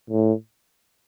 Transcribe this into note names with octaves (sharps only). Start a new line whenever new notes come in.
A2